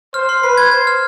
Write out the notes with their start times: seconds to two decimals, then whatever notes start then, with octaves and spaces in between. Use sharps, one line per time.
0.14 C5 F6
0.29 C6
0.43 B4 C7
0.58 G#6
0.71 C5 G#6
0.87 F6